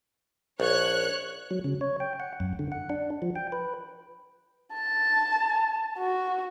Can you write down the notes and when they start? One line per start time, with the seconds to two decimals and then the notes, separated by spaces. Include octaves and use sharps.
0.60 A#1 C#5 F#6
1.51 F#3
1.64 C#3
1.81 C#5
2.00 G5
2.20 F#5
2.40 F#2
2.59 D3
2.72 F#5
2.90 D4
3.22 F3
3.36 G5
3.52 B4
4.74 A5
5.99 F#4